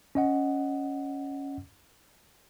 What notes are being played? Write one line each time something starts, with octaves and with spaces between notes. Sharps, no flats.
C#4 D#5 F#5